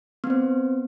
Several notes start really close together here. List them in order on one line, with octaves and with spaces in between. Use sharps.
B3 C4 C5